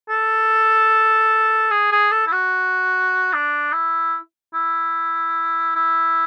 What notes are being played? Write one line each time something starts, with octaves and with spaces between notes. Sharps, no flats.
A4
G#4
G#4
A4
E4
F#4
D4
E4
E4
E4